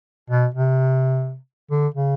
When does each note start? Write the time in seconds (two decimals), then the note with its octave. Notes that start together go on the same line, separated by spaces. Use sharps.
0.30 B2
0.55 C3
1.71 D3
1.94 C#3